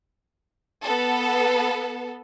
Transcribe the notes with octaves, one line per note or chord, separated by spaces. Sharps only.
B3 A4